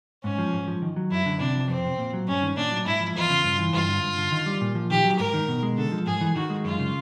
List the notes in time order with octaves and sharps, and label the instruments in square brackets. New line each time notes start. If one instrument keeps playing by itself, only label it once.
[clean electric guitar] G#2 [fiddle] C#4
[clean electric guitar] F3
G#2
F3
D#3
F#3
[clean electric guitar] F#2 [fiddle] E4
[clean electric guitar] D3
[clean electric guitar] C3 [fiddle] D4
[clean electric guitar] F3
[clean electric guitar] F2 [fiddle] C4
[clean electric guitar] C3
A#2
F#3
[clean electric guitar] G2 [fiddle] C#4
[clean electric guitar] D#3
[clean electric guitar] A#2 [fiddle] D4
[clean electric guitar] F#3
[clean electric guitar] G#2 [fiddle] E4
[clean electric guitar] F3
[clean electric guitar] E2 [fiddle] F4
[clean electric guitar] C#3
G2
E3
[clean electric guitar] G2 [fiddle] F4
[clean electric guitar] D3
G2
D3
D#3
G3
A#2
F3
[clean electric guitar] D#3 [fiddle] G4
[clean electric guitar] F#3
[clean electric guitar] G#2 [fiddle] A#4
[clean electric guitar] D#3
B2
G#3
[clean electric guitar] D3 [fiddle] A4
[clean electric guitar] F3
[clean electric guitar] G#2 [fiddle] G#4
[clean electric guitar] E3
[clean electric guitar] D#3 [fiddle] F#4
[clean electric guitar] G#3
[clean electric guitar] F#2 [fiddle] F4
[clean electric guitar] C#3